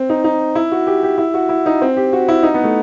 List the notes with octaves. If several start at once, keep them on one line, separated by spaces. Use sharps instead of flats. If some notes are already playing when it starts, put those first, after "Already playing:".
Already playing: C4
D#4
D#4
E4
F#4
G4
G4
E4
F#4
E4
D#4
C4
G4
F#4
E4
D#4
B3
A3